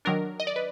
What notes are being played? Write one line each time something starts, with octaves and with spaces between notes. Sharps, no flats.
D#3 F#3 D4 A#4
D#5
D5
B4